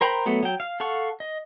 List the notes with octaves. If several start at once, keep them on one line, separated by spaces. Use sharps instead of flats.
A#4 C5 G5 A#5 B5
F#3 A3 B3
F#3 G5
F5
A4 F5 F#5 C#6
D#5